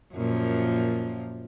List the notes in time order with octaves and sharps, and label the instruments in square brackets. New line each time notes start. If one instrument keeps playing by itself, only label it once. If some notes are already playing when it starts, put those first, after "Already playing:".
[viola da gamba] F#2 A#2 F3